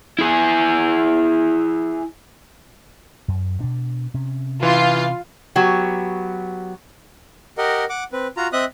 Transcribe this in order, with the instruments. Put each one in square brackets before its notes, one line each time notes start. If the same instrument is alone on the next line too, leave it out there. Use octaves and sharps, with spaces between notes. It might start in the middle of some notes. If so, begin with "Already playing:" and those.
[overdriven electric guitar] E4 G#4
[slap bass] F#2
B2 D4
C3 C#4
[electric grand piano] E3 [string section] F4 F5
[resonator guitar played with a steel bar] F#3 B3 F#4 G4
[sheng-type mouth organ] G4 A#4 D#5 F#5
F#5 D6
C4 B4
F4 F#4 A#5
C4 D#5 E5 D#6 F#6